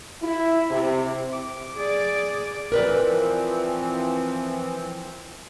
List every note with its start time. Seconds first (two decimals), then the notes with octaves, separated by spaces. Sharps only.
0.22 E4
0.69 C3
1.33 D6
1.75 G#4 D5
2.72 E3 F3 C4 A#4 B4 D5